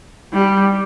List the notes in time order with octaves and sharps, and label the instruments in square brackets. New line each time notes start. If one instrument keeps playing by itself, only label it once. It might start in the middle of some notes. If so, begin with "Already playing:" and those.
[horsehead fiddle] G3